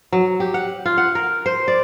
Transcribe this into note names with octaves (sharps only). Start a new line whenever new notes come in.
F#3
G4
F#5
F4
F#5
A#4
C5
D5